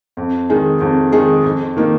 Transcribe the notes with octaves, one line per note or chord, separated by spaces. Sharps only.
F2
D#3 G#3 D#4 G#4
F2
D#3 G#3 D#4 G#4
F2
D#3 A#3 D#4